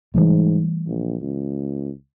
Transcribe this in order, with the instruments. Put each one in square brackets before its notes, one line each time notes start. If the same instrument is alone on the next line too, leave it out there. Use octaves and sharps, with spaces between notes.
[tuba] G#2 [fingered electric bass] E3 G3 A3
[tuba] A#1
C#2